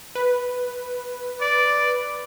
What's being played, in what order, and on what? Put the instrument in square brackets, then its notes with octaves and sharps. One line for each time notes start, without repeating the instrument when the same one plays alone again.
[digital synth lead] B4
[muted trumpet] D5